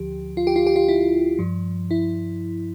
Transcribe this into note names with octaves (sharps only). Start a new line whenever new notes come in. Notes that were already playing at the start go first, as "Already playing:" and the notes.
Already playing: D2 D3 F3 G4
F4
G4
F4
G4
F4
E4
G2 F3
E4